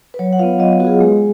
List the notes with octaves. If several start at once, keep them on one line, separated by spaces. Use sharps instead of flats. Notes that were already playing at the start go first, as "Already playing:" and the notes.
B4
F#3 C#5
F#5
B3 F4 F5
F#3 D#5
B3 F4 F#4 G#4
G#3